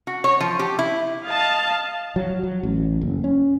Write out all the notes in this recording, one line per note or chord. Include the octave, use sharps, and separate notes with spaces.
F#4
C#5
F3
G4
E4
D#5 F5 A5
F#3
F#3
A1
F#1
C#4